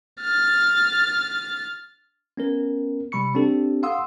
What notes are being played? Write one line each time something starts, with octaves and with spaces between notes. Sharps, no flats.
F6 A6
B3 C#4 A#4
C3 G3 B5 C#6 C#7
C4 D4 G4 A4
F5 F#5 C6 D#6 E6